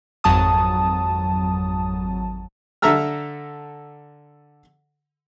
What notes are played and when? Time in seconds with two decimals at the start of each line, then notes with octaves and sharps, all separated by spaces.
0.24 G#1 F2 F#3 A5 D#6
2.82 D3 A4 E5 A#5 E6 F6